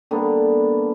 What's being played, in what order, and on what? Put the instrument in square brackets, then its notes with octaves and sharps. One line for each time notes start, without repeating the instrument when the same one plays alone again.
[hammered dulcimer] D3 G3 A#3 B3